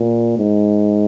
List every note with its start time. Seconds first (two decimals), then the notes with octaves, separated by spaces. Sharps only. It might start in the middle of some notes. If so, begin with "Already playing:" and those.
Already playing: A#2
0.38 G#2